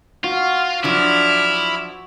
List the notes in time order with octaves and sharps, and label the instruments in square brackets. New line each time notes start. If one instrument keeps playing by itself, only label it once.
[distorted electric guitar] F4 [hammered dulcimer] F#4
[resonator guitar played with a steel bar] F3 F#3 D4 [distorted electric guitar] E4 [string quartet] D6 F6